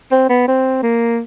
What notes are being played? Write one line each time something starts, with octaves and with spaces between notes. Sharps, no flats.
C4
B3
C4
A#3